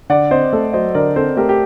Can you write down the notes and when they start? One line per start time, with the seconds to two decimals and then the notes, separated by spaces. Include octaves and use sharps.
0.10 D3 D5 F#5
0.31 C4 C5 D#5
0.53 A3 A4
0.73 F#3 C5 D#5
0.94 D3 A#4 D5
1.16 C4 A4 C5
1.37 A3 G4 A#4
1.49 G4